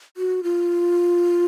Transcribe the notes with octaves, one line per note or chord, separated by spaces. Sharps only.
F#4
F4